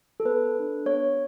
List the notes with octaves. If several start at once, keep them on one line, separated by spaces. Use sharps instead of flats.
A4
B3 B4
D4 A4
B3 C#5